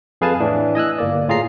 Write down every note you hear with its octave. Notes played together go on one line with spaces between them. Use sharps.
F2 G#4 B4 F5 G#5 A5
A2 E3 D4
D#5 G#5 E6 F#6
G1 A#3 D5
A2 F4 G#4 A#5 C7